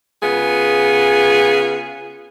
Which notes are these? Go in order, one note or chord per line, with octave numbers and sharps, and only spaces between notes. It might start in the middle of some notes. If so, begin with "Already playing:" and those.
C#3 B3 F4 G#4